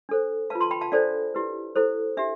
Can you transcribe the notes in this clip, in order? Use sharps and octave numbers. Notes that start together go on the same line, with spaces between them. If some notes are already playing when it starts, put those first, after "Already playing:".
D4 A4 C5
F4 B4 F5 A5
A5 C6
G5 B5
F5 A5
D4 A4 C5 D5 F5
E4 G4 B4
E4 A4 C5
D4 G4 E5